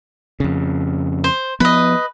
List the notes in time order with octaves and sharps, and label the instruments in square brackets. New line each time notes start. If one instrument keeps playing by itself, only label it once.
[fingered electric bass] F2 C#3
[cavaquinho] C5
[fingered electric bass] F3 B3 [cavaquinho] B4 D#5